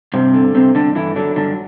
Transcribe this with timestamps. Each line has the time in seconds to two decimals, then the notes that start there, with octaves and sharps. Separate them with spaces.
0.14 G2 C3 C4
0.34 D3
0.55 G2 C3 C4
0.75 G2 D3 D4
0.95 D3 E3 E4
1.16 D3 F#3 D4
1.36 G2 D3 D4